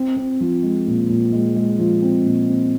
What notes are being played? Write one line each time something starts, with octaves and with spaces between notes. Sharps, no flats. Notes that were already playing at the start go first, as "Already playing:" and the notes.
Already playing: C4
C4
F3
G#3
A#2
A#2
G#3
G#3
F3
C4
A#2
C4